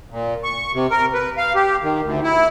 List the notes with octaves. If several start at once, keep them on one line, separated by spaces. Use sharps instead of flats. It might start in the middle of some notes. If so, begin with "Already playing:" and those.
A#2
C#6
C3
A#4
B4
F5
G4
D#3
D2
E4